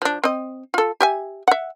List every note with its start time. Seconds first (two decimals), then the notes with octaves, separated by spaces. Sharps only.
0.02 F3 D4
0.24 C4 D#5
0.74 F4 A4
1.00 G4 E5 G#5
1.48 E5 F#5